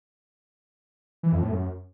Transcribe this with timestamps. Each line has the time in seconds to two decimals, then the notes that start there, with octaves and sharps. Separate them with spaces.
1.23 E3
1.33 F2
1.42 A2
1.51 F#2